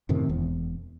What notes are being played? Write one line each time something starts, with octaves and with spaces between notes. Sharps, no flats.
F#2 A2 C3 D#3
E1 E2